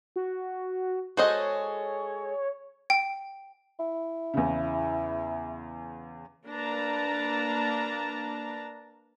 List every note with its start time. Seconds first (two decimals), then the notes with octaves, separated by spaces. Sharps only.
0.16 F#4
1.17 G#3 F#4 G#4 A4 C5 C#5 D#5
2.90 G5
3.79 E4
4.34 E2 C#3
6.48 A#3 D4 B4 A5 A#5